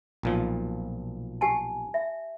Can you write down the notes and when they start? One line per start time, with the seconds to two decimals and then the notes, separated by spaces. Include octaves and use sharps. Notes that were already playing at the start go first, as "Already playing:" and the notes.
0.23 B1 A#2 F3
1.41 G4 G#5 A5
1.94 E5